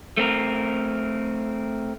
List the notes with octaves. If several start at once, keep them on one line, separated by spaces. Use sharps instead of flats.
A3 C4 A#4